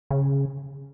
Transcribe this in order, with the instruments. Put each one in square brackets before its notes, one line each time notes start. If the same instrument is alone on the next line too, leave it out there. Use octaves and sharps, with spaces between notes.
[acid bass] C#3